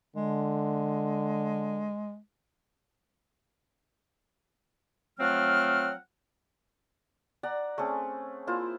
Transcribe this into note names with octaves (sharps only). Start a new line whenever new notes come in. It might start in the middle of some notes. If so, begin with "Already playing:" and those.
D3 G#3
F3 F#3 A3 C4 F#5 F6
D5 F#5 A#5
A3 C4 C#4 G#4
A#3 E4 F4 C5